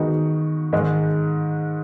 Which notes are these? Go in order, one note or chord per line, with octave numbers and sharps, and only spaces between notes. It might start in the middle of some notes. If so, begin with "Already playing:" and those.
Already playing: D#3 G#3 B3 D#4 F#4
G#2 D#3 G#3